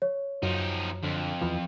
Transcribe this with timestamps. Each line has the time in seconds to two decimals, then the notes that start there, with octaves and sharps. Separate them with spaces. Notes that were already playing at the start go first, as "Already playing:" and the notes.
0.02 C#5
0.43 F#2 F3 D#4
1.03 F2 D3
1.41 E2 E3 F3